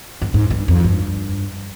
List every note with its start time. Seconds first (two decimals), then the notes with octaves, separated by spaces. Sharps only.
0.22 G2
0.34 G#2
0.50 G2
0.68 F2
0.84 G2